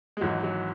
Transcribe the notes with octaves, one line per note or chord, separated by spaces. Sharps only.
G#3
G#1 G#2 E3 F#3
F#3